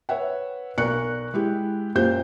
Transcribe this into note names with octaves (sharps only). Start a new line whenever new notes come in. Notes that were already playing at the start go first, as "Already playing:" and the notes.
B4 C#5 E5 F#5
B1 A#4 D5 C#6 F#6 C#7
G#3 E4 G4
F#2 A#2 F4 G4 C5 G6